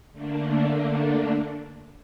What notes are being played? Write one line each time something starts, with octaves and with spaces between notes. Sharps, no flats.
D3 A3 A#3 D4